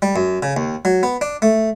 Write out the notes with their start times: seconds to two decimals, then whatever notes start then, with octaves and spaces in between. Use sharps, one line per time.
0.02 G3
0.16 F#2
0.43 C#3
0.57 D#2
0.85 F#3
1.03 B3
1.21 D4
1.42 A3